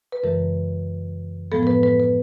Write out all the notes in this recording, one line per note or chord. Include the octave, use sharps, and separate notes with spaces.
B4
F#2 C#3 E3 G#3 A#4
A2 F3 G#3 B3 A4
A#4
B4
B4
B4